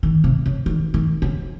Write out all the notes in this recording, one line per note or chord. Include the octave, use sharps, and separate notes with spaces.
D#3
C3
C#3
D#3
D#3
C#3